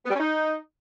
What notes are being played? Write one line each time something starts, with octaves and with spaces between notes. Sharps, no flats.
B3
G3
C#4
D#4